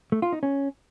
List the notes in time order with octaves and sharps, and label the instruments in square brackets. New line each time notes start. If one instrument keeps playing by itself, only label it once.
[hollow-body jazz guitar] A3
F4
D#4
C#4